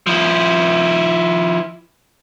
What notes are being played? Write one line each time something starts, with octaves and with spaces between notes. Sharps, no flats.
F3 E4